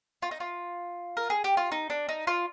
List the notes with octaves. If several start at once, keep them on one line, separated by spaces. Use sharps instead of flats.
F4
D#4
F4
A#4
G#4
G4
F4
D#4
D4
D#4
F4